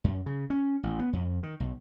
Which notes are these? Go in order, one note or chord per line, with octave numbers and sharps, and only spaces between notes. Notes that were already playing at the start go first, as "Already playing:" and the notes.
F#2
C#3
C#4
A1
B3
F2
D#3
B1